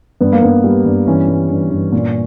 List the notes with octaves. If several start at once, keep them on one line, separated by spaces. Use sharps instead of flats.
G2 B3
A#3
G2 B3
G3
G2
E3 C#4
G3
G2
G2
A#2